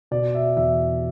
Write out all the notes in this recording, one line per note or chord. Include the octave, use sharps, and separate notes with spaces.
B2 D5
E5
E2 E5